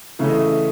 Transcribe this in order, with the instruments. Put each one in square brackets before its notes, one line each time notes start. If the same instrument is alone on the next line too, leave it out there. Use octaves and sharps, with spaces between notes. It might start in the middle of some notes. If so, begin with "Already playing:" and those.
[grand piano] C#3 E3 A3 C#4 E5
D#5
E5